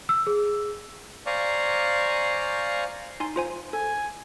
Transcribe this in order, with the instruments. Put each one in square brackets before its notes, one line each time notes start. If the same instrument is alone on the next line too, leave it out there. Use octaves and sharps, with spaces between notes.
[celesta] E6
G#4
[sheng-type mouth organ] C5 D5 F5 G#5 A#5 C#6
[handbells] D#4 G#5 C6
F4 C5 G#5
[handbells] A4 [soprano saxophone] G#5